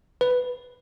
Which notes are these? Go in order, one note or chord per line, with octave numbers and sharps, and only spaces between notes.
B4